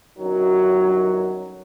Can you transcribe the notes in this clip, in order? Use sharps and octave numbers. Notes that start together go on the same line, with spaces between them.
G1 F#2 D#3 F#3